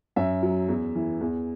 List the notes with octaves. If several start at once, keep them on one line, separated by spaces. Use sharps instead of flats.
F#2 E5
F#3
E2
E3
E2